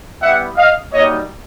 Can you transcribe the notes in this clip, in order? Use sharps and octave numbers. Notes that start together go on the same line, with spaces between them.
G3 B3 E4 G4 E5 F#5
D#5 F5
G3 A#3 D#4 F#4 C#5 D#5